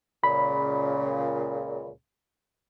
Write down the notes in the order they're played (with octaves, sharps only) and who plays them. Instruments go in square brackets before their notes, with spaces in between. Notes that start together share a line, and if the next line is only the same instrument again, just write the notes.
[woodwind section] C#2 A#2 C#3 [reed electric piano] B5